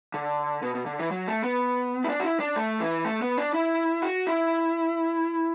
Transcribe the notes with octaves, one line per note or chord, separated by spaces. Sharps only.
D3
B2
B2
D3
E3
F#3
A3
B3
E4
D4
F#4
E4
D4
A3
E3
A3
B3
D4
E4
F#4
E4